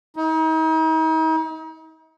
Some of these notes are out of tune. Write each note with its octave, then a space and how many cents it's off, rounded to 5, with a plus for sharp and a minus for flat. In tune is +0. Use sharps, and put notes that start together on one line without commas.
D#4 +40